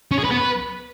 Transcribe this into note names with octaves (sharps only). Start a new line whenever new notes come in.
C#4
G#4
B4
B3
B4